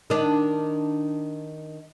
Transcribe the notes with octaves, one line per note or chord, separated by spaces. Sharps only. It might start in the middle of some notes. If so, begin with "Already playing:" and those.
D#3 D4